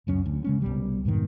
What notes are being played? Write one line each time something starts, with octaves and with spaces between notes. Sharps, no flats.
C#2 F#2 C#4
D2
C#3 G#3 C#4
C2 B2 G3
F2 G#2 B2 D#3